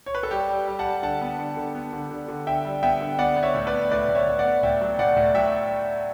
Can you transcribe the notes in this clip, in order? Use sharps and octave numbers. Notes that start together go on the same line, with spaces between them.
C#5
B4
A4
G3 G4
G3
G3
F#5 A5
G3
D3 F#5 A5
B3
D3
D3
B3
D3
D3
D3
D3 E5 G5
G3
B3 E5 G5
D3
B3 D5 F#5
B3
C#5 E5
A2
B4 D5
B3
A2 B4 D5
A2
C#5 E5
A2
D5 F#5
B3
A2 E5 G5
F#3
A2 D5 F#5
A2
F#3 E5 G5